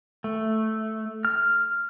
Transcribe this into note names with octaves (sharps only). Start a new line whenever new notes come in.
A3
F6